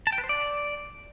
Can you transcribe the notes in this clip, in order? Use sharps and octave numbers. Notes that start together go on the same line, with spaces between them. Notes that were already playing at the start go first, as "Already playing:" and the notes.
A5
G5
B4
C5
D5